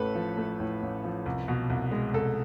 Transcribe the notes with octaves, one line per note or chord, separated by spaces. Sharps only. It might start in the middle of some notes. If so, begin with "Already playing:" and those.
Already playing: A1 A2 A3 A4 B4
F3
A3
A2
A1
F3
C2
B2
C2
G#3
C2 A4